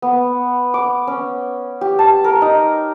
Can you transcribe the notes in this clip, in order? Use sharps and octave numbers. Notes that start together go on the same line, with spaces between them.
B3
D6
C#4
G4
A5
A#4
D#4